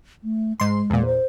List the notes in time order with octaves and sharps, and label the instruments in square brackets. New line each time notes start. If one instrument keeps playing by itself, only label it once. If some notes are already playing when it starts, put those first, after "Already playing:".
[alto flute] A3
[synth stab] G#2 C6 [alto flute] G#3
[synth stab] E2 A#2
[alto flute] C5